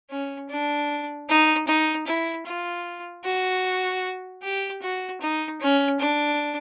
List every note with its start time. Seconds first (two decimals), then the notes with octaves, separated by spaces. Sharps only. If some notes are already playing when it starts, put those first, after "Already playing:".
0.10 C#4
0.49 D4
1.29 D#4
1.67 D#4
2.07 E4
2.46 F4
3.24 F#4
4.43 G4
4.82 F#4
5.21 D#4
5.61 C#4
6.00 D4